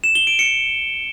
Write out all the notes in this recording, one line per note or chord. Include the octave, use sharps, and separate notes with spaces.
E7
G7
D7
C#7